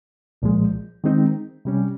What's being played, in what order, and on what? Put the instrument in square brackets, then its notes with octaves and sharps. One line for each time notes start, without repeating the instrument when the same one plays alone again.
[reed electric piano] C2 A#2 F3 G#3
D#3 G#3 C4 D#4
C3 G3 C#4